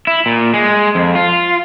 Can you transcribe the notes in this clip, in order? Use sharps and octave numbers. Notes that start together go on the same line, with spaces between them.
E4
A#2
G#3
F2
F4